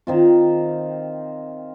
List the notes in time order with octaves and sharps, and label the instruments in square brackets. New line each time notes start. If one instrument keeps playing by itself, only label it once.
[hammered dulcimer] D#3 C4 F4